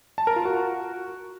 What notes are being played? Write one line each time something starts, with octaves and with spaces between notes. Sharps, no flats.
A5
A#4
F4
F#4